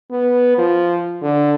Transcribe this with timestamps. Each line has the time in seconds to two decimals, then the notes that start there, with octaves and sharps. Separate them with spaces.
0.12 B3
0.58 F3
1.22 D3